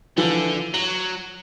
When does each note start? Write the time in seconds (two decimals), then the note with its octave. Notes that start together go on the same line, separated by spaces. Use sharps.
0.18 D3 E3 F3
0.74 F#3 F#7